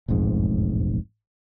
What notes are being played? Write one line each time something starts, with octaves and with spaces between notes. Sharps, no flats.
E1 A1 F2 G#2